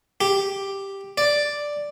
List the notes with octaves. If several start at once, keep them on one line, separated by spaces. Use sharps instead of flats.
G4
D5